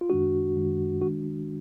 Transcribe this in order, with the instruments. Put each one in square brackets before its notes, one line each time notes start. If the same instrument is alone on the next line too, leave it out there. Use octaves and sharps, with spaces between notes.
[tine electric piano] F4
F#2 D#3 G#3 D4 F#4
F#2 D#3 G#3 D4
D#3 G#3 D4 F#4